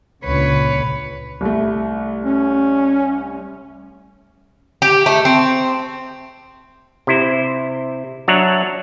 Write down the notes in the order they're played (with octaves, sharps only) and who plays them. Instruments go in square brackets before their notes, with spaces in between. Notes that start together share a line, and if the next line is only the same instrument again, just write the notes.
[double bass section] C#2 A#2 D3 [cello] B4 C#5
[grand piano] C2 A3
[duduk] C#4
[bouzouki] G4
A3
C4
[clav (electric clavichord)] C3 E4 C5
F#3 D4 C#5 E5 F#5 A#5